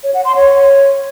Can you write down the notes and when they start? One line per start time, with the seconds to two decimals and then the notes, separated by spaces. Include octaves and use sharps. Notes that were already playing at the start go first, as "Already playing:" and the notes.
0.04 C#5
0.14 F#5
0.25 C6
0.36 C#5